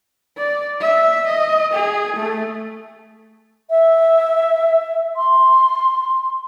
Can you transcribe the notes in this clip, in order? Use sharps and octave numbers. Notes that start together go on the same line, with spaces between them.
D5
E5
D#5
G#4
A3
E5
C6